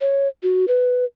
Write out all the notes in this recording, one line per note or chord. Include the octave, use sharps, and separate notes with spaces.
C#5
F#4
B4